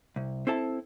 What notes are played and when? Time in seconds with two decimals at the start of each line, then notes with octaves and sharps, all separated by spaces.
0.16 C2
0.47 C4 E4 A4 A5